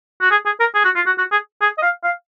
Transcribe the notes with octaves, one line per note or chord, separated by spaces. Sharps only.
F#4
G#4
G#4
A#4
G#4
F#4
F4
F#4
F#4
G#4
G#4
D#5
F5
F5